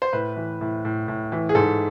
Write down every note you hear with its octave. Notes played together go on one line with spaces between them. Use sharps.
C5
A2 B4
E3
A2
A2
A2
E3
G#4
G#2 A4